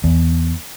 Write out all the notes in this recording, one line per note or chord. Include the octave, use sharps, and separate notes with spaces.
E2